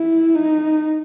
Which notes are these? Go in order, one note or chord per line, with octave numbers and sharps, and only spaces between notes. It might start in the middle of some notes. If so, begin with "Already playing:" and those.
Already playing: E4
D#4